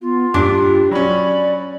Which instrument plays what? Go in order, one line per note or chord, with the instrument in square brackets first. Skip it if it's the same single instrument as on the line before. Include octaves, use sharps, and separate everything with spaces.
[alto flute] B3 [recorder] F4
[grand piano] G2 [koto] D4 [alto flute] G4
[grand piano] F#3 C#4 [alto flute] D5 [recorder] B5